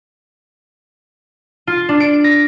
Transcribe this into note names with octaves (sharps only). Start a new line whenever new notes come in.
F4
D4
D7
A#6